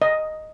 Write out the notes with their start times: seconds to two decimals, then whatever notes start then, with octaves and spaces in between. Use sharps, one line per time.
0.02 D#5